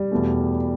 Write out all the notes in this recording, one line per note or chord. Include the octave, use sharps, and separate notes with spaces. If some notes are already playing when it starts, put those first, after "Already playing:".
Already playing: G3
E2 B2 A3